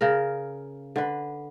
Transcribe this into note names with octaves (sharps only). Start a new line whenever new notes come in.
C#3 A#4
D3 B4